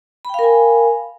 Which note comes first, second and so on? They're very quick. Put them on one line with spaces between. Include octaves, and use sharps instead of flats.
B5 G5 F5 A#4 G#5